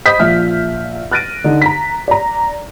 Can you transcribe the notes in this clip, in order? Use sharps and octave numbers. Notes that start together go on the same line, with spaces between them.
C5 D#5 B5 D#6 G6 B6
A#1 F3 E5 F6
F6 F#6 A6 A#6 D7 D#7
D3 D#4
A#5 B6
D5 A#5